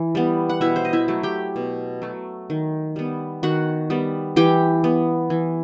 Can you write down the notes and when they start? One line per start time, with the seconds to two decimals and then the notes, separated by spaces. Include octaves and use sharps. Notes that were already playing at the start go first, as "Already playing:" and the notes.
Already playing: E3
0.15 G3 B3
0.50 F#5
0.61 B2 E4 E5
0.76 C5
0.85 D#5
0.93 E4 E5
1.08 F#3 A3
1.23 G4 G5
1.56 B2
2.02 F#3 A3
2.50 D#3
2.96 G3 B3
3.43 D#3 F#4 F#5
3.90 G3 B3
4.36 E3 G4 G5
4.84 B3
5.30 E3